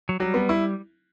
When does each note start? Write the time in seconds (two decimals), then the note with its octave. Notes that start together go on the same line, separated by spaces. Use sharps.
0.09 F#3
0.20 F#3 G3
0.34 B3
0.49 E4